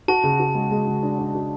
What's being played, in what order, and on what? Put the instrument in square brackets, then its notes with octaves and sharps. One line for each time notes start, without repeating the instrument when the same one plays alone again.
[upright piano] F#4 [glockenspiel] A5
[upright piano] C#3
F#4
G#3
G#3
C#3
D4
D4
F#4